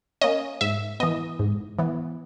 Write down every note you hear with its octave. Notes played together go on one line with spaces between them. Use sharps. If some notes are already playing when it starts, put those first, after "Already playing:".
A#3 C#4 D#5
G#2 E5
E3 B3 D#5
G#2
E3 B3